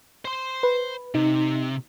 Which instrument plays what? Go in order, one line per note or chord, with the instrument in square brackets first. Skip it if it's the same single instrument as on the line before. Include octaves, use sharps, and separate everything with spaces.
[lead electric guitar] C5 C6
[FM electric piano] B4
[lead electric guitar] C3 [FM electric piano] D#4